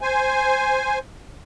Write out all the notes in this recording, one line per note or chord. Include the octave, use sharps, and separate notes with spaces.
C5 G#5